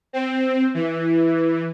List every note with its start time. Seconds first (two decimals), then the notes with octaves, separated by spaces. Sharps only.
0.13 C4
0.74 E3